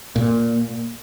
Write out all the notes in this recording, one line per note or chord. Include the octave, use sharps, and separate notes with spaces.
A#2